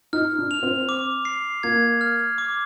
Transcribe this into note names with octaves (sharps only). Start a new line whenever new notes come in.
D#4 F6
D4
F7
C4
D6
C7
A#3 G#6
F6
D6